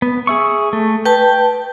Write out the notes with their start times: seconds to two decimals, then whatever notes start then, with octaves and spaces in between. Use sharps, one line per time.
0.02 B3
0.27 G#4 E5 C#6
0.73 A3
1.06 B4 G5 A5